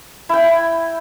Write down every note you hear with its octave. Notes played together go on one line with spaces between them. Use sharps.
E4 G5